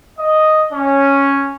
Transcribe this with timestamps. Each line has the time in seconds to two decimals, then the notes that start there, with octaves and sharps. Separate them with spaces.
0.19 D#5
0.73 C#4